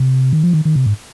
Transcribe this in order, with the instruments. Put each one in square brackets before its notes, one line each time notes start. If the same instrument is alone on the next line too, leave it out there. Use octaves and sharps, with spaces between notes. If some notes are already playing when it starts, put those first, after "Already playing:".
Already playing: [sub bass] C3
D#3
F3
D#3
D#3
C3
G#2